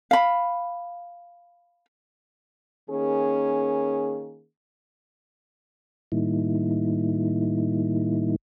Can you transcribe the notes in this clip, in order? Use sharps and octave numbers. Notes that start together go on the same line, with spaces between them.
F5 B5
D#3 A#3 C#4 G#4
A2 D#3 G3 A#3 D#4 E4